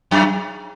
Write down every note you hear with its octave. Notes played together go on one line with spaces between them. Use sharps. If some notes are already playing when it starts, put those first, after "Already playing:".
F#2